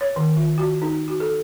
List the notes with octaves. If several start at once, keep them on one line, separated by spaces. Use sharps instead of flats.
C#5
D#3
F4
F#4
D#4
F#4
A4